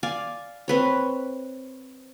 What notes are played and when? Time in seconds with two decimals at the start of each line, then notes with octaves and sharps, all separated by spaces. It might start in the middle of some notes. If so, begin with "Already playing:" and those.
0.03 D5 F5 G#5
0.68 C4 B4 C#5